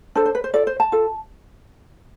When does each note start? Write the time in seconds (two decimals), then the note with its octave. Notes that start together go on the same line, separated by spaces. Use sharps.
0.15 D4 A4 C5
0.25 C5
0.35 B4
0.44 C5
0.54 F4 A4 D5
0.67 C5
0.80 A5
0.92 F4 A4